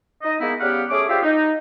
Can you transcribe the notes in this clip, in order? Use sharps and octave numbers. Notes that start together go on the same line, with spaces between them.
D#4 D#5
G#3 A#3 B3 D#4 E4
C#3 G3 B3 G4 F5 F#5
A3 C#4 G#4 D6
F4 G4 G#4 C5 D5 E5
D#4